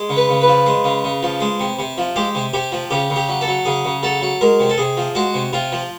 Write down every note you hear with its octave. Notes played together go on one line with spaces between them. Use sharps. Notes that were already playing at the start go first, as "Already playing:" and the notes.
Already playing: G#3
C#3
B4
C#3
B4
F3
G#3
C#3
C#3
F3
G#3
C3
C3
F3
G#3 G4
C3
C3 G4
F3
C#3 G4
C#3
G4
F#3
A4
F#3
C#3 G#4
C#3
F#3 A4
F#3
G#3 A#4
C3
A4
C3 G#4
F3
G#3 F#4
C3
C3 F4
F3